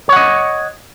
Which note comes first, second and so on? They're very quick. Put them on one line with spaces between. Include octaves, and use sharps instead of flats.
C#5 F#5 D#5